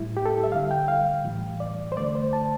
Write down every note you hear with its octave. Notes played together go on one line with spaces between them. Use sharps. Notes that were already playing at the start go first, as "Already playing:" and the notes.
Already playing: A2 G3 E4
G4
A4
E5
D3 G3 F5
G5
F5
A2 E3 G3
D5
C5
D3 A3 D5
C5
A5